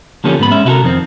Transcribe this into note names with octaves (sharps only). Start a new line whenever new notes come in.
D3 F3 A#3 C#4 G4 A4
G#2 B3 B5
G#3 C#4 E5
C3 E4 F#4 G4 A4 A#4
F2 D#3 C4